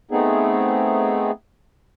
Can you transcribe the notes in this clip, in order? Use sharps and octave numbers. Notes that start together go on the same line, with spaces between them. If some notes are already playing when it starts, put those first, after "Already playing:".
A3 B3 C4 D#4 G#4